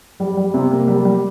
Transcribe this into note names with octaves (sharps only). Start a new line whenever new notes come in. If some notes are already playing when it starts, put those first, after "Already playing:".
G3
G3
C3
A#3
G3
G3